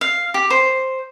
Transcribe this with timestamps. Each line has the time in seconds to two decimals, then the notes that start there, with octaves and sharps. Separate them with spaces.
0.01 F5
0.34 G4
0.50 C5